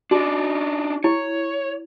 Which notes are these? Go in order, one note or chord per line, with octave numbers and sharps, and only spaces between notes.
D4 D#4 F#4
E4 C#5